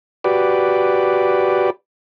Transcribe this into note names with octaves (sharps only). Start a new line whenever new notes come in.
F#4 G4 B4 D5